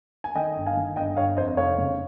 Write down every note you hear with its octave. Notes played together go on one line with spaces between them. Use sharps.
G#5
D#3 D#5 G5
G1
F5 G#5
D#3
G1 D#5 G5
G1 C#5 F5
F2 C5 D#5
D#5
F1 C#5 F5
C#3